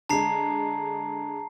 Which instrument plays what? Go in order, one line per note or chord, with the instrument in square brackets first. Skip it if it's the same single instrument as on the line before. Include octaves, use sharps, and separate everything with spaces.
[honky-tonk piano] D3 G#3 [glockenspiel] A5 A#5 C7